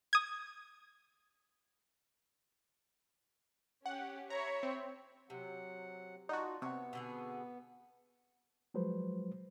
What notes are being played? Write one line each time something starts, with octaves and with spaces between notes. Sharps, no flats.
D#6 G#6
C#4 G4 F#5
C#5 E5 A#5 B5
C4
C3 F#3 F#5
D#4 F4 F#4 D5 F#5 A5
C3 B3 C#5 F#5 A5 C#6
B2 D3 G#4
F3 F#3 G#3 B4 C5